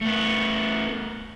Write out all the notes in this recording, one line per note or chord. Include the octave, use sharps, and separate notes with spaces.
A3 B3